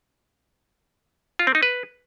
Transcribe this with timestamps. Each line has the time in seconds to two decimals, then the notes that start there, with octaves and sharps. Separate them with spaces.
1.39 F4
1.47 C4
1.55 D#4
1.63 B4